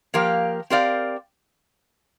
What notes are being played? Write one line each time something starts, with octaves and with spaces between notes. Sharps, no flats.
F3 A#3 G4 A#4 F5
C4 G4 A#4 D5 F5